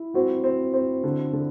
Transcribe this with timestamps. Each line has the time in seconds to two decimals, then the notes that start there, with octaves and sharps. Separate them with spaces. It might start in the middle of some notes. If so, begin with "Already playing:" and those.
Already playing: E4
0.14 C4 F#4
0.44 C4
0.74 C4
1.04 D3
1.33 D3